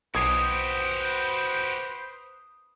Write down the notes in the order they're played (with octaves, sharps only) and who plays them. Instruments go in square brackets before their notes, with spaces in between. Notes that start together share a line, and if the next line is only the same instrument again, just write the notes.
[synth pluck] B1 G#6 C7 [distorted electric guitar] F#4 G4 [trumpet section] B4 C5 [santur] D#6